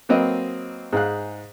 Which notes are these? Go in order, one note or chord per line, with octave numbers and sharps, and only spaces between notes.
F#3 A#3 C4 B4 D#5
G#2 G#4 F5 F#6